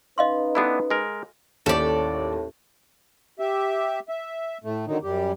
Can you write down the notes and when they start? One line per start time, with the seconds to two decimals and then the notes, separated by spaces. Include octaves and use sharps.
0.18 C#4 D#4 B4 D#5 F5 C6
0.55 B3 D4 E4 F#4 A4 B5
0.91 G#3 A#4
1.66 D#2 A2 A3 C#4 G4 A4 D5
3.39 G4 E5
4.09 E5
4.64 A2 A3
4.87 D3 D#3 F#3 D#4
5.03 F#2 G3 G4